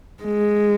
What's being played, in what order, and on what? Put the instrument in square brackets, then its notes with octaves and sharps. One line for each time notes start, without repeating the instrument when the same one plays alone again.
[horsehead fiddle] G#3